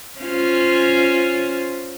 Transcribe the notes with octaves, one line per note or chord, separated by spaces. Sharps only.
C#4 F4 C5